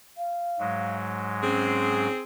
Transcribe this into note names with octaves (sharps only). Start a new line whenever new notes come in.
F5
G#2 F#3 G#3
C4 C#4 G#4